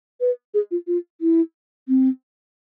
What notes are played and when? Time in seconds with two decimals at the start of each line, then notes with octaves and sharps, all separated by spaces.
0.21 B4
0.54 G#4
0.71 F4
0.87 F4
1.21 E4
1.88 C4